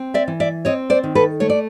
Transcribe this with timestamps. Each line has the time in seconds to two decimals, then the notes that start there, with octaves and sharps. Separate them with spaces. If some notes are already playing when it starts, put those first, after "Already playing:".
Already playing: C4
0.14 D5 E5
0.28 E3
0.40 D5 E5
0.65 C4 C#5 D#5
0.90 C5 D5
1.04 D#3
1.15 A4 B4
1.40 A3 C#5
1.50 D5